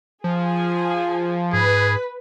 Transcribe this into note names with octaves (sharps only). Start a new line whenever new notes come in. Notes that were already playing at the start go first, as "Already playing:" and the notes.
F3 G#4 G#5
G#2 G#4 B4